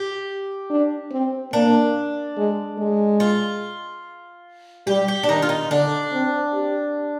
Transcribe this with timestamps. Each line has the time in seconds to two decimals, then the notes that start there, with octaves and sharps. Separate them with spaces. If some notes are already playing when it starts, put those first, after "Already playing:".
Already playing: G4
0.70 D4
1.12 C4
1.53 A#3 D4
2.37 G#3
2.78 G#3
3.20 F4
4.87 G3 G4
5.08 G4
5.23 D4
5.28 D#3 D#4
5.42 F4
5.49 D#4
5.70 D3 D4
6.12 C4
6.54 G4